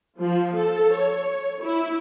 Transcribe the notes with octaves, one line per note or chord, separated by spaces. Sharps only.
F3
A4
C#5
E4